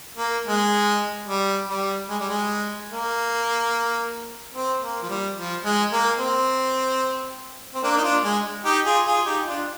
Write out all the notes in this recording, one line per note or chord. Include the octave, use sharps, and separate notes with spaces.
A#3
G#3
G3
G3
G#3
G3
G#3
A#3
C4
A#3
F3
G3
F3
G#3
A#3
C4
C4
A#3 D4
D#4
D4 F4
G#3
D#4 G4
F4 G#4
F4 G#4
D#4 G4
D4 F4